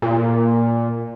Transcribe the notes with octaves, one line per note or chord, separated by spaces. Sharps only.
A#2